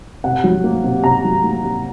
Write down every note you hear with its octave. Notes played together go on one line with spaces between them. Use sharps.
C3 F#5
F#3
A#3
C3
C3 A#5
F#3
A#3
C3